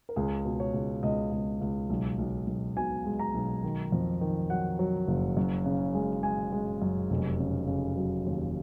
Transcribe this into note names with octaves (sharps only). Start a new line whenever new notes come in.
A#4
C#2 G#4
B2
C#5
C#2
C#2 D#5
C#2
C#2
B1
B1
B1
B2 G#5
G#3
A#5
B1
D#3
F2
D#3
F#3 F#5
F#3
F#1
F#2
C#3
G#3
G#3 G#5
G#3
F#2
F1
C#3
C#3
F#3
D#2